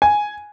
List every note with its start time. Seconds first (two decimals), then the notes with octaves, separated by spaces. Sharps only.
0.02 G#5